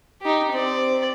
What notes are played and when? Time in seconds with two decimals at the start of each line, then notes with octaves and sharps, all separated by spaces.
0.22 D#4 G4
0.53 C4 D5